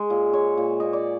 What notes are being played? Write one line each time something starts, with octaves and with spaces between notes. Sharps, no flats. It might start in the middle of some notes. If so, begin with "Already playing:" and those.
Already playing: G#3
A#2
G#3 C#5
A#2
A#2 D#5
D5